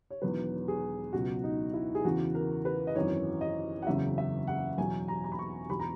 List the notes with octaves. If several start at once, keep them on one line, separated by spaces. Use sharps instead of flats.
C#5
E1 E2 D#3 F#3 B4
G#4
C#2 B2 F#3 F#4
D#4
E4
G#4
E2 C#3 E3 F#4
A#4
B4
D#5
G#1 F#2 E3 C#5
D#5
F#5
F#1 E2 C#3 F#3 E5
E5
F#5
E2 B2 F#3 G#5
A#5
A#5
B5
C#6
E1 E2 B2 B5
A#5